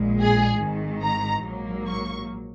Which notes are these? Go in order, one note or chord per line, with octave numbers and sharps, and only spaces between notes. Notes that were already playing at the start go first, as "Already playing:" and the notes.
Already playing: A#1 A#2 G#3
G#4
G#1 G#2 D#3
A#5
A#1 G#2 F#3 A#3
C#6